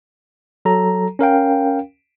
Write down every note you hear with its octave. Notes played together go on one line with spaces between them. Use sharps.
F#3 A4 A#5
C#4 A#4 F5 G5